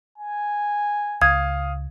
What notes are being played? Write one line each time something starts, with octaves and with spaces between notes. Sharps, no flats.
G#5
C#2 F5 D#6 G#6